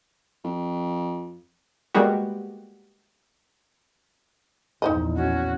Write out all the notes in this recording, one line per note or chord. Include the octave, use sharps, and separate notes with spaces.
F2
G3 G#3 A#3 B3 F#4 G4
A#1 E2 D#4 C5 D#5
C#4 F#4